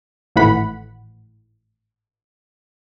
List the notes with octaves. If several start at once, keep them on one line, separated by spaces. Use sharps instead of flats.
G#1 A2 E3 F#5 B5